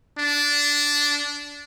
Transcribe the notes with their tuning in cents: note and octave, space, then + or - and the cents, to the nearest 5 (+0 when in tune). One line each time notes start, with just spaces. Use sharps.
D4 -15